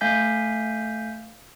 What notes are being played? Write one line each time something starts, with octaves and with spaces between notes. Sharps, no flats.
A3 F5 G#5 G6 B6